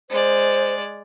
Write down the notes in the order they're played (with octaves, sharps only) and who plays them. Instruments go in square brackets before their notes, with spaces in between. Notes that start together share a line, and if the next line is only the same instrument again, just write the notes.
[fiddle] G#3 D5 [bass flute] C5